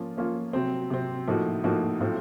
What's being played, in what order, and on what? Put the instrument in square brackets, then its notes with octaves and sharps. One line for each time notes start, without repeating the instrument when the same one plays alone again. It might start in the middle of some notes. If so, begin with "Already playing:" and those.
Already playing: [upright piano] F3 A#3 C#4 F4
F3 A#3 C#4 F4
C3 F#3 C4
C3 F#3 C4
A2 F3 A#3 D#4 F#4
A2 F3 A#3 D#4 F#4
A2 F#3 C4 F4